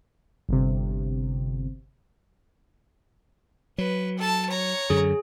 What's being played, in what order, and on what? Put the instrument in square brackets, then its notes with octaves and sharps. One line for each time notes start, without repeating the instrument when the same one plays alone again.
[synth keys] G1 C3
[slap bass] F#3 [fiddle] B4
[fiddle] A4 A5
C#5 A#5
[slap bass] F#2 D3 [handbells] G#4